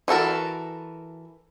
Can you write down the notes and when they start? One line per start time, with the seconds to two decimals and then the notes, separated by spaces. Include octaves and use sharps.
0.08 E3 F#4 A4 A#4